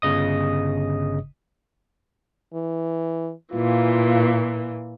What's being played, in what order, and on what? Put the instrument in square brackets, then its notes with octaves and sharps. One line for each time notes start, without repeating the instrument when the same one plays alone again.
[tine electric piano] G1 C#3 D#5 D#6
[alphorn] E3
[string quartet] A#2 E3 [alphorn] F4